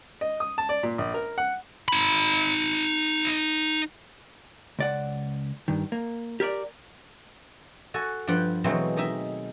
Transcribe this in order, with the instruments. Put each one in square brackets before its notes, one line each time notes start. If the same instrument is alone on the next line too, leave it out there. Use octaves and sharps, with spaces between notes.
[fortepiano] D#5
D#6
A5
D5
A#2
A#1
A#4
F#5
[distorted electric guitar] D#4 B5
[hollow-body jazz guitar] C#2 D5 F#5
G2 D#3
A#3
G4 A#4 C#5 D5
[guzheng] F#4 A4 G#5
G2 F3 F4 F#5 G5
B2 E3 F#3 G#3 A3 C4
D#3 D#4 D#5 E5